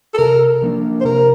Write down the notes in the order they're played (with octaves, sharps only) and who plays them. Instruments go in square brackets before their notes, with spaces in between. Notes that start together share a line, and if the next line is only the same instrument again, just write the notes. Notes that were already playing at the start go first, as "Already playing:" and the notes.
[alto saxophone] A4
[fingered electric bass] C3 [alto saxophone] A#4
[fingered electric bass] F3 A#3 D4
[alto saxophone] C5
[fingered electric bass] C3 [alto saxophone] A#4